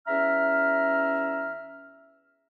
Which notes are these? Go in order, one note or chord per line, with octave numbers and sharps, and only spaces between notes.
E2 C#4 E5 A#5 F6